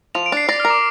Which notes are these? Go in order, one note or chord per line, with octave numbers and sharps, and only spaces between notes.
F3 F7
D7
D4 C7
D5 A#6
F6
A#4
D6